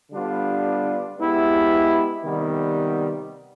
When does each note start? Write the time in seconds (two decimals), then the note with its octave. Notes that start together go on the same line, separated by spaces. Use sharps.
0.11 D3 G3 B3 D4 F4
1.17 G#3 B3 E4 G4
2.24 C3 D#3 G3 B3